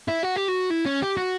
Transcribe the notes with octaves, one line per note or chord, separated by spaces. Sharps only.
E4
F#4
G4
F#4
E4
C#4
G4
F#4